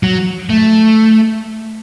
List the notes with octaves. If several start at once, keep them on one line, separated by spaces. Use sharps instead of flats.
F#3
A3